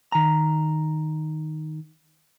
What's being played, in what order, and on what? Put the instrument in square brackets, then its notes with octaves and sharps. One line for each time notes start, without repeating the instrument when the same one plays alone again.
[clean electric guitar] D#3 A#5